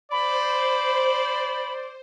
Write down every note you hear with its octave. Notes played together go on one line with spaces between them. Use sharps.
C5 D5 B5